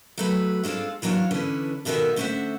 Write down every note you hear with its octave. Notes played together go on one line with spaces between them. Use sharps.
F#3 A3 B4
G#3 C4 D4 F4 A4
E3 F#3 B3 D4 C#5 F5
D3 E3 C#4 D4 E4 B4
F2 B2 D#3 B3 A4 E5
D3 A3 C#4 C5 E5 F#5